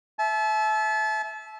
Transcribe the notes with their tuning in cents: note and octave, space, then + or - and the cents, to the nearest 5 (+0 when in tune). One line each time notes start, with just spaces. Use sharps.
E5 +0 A5 -35